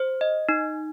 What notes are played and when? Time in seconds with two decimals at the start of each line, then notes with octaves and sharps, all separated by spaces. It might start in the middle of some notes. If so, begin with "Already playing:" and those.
Already playing: C5
0.21 D#5
0.49 D#4